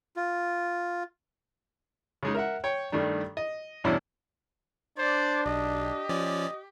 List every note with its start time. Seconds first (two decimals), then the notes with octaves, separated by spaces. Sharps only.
0.16 F4
2.23 C#3 G#3 D#4
2.35 A#4 E5 F#5
2.64 C#5 G5
2.92 G2 D#3 G3 A3 D4
3.37 D#5
3.84 E2 G2 B2 C#4 D4 E4
4.98 D4 C5 D5
5.46 B1 G4 D#5
6.09 F3 C#4 D5